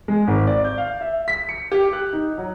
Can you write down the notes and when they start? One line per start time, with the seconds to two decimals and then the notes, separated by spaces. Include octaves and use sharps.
0.08 G#3
0.27 G#1
0.47 D5
0.64 G6
0.78 F5
1.01 E5
1.28 B6
1.49 C#7
1.72 G4
1.93 F#6
2.13 D#4
2.38 F#3